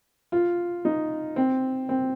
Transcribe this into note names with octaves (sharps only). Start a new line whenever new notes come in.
F4
D#4
C4
C4